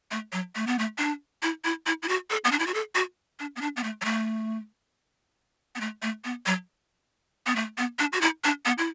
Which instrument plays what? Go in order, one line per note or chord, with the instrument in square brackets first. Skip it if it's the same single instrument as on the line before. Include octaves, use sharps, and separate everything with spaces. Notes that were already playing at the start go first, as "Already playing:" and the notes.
[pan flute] A3
F#3
A3
B3
A3
D4
E4
E4
E4
E4
F#4
A4
B3
D4
E4
F#4
A4
F#4
D4
B3
D4
B3
A3
F#3
A3
B3
A3
A3
B3
F#3
B3
A3
B3
D4
F#4
E4
D4
B3
E4